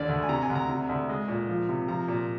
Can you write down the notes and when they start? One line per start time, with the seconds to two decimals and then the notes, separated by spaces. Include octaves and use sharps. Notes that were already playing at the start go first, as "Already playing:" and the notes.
Already playing: D#2 D3 D5
0.09 D2
0.23 G#5
0.29 C3 A#5
0.42 G#5
0.50 D2
0.55 A#5
0.69 C3
0.89 D2
1.09 G#3
1.28 A#2
1.49 F3
1.69 C3
1.88 F3 A#5
2.08 A#2